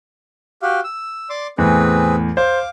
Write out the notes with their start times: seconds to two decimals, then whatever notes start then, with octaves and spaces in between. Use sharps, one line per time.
0.62 F#4 G4 F5
0.84 E6
1.30 D5 C6 D6
1.58 E2 A2 C4 G#4 B4
2.37 C5 F5 D6